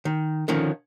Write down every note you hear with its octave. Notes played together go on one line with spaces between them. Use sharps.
D#3
D3 D#3 F3 C#4